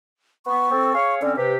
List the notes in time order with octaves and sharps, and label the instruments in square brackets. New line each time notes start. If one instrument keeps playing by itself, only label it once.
[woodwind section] B3 [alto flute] C#6
[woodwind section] C4 A4
G#4 C#5 F5
[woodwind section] D3 C4 C#4 [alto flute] D5
[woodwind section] C3 G4 [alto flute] B4